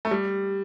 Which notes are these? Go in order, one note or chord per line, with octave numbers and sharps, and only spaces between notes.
A3
G3